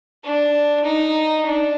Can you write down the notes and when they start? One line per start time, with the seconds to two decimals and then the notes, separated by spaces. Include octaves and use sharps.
0.24 D4
0.84 D#4
1.46 D4